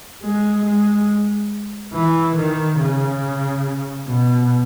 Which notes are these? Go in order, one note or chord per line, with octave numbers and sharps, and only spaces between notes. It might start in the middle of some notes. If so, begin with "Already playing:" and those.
G#3
G#3
E3
D#3
C#3
B2